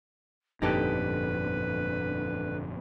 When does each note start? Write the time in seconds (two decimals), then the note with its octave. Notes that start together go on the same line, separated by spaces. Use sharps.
0.62 G1 F2 A#2 D3 D#4 G4 A4 B4